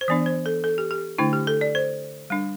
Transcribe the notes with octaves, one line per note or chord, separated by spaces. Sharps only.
C5
E3 B3 D4 D5
C5
A4
A4
G4
G4
D3 A3 D4 E4
G4
A4
D5
C5
G3 D4